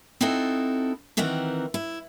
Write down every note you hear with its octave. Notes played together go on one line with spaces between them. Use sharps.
C4 D#4 E4 F#4 A4
D#3 E3 C4 A#4 F#5
E4